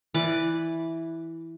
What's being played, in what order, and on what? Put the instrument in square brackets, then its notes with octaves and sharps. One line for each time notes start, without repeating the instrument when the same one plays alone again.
[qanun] E3 B4 D5 D6